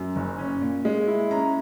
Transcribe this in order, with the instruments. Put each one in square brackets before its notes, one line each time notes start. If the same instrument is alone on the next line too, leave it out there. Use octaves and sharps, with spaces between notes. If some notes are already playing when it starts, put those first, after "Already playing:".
Already playing: [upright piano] F#2
F#1
C#4
A#2
G#3
E4
C#4 A#5